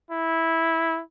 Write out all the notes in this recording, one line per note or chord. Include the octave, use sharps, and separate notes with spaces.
E4